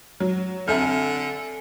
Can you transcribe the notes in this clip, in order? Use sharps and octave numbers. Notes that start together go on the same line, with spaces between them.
F#3
D3 C4 A4 E5 G#5 F6